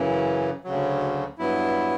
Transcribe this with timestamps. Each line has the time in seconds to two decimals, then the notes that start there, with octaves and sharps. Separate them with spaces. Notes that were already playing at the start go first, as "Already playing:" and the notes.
Already playing: F#2 C#3 E3
0.64 D2 C#3 F#3
1.38 G2 F#3 B3 E4